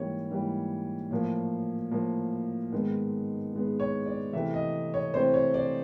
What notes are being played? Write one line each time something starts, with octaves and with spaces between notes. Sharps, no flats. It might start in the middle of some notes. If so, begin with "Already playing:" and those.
Already playing: G#2 E3 G3 A#3 C#4 C#5
G#2 E3 G3 A#3 C#4
A2 F3 A#3
A2 F3 A#3
G#2 D#3 G#3 B3
G#2 D#3 G#3 B3
C#5
D5
C3 E3 A3 C4 E5
D#5
C#5
C3 E3 A3 C4 C5
C#5
D5